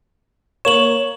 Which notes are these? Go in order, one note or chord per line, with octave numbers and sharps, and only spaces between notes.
A#3 C#5 E7 F#7